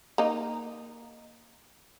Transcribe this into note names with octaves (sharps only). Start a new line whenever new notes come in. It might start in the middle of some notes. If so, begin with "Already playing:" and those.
A#3 D#4